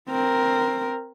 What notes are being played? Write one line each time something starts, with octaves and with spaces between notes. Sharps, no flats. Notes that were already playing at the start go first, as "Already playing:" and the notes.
C4 A#4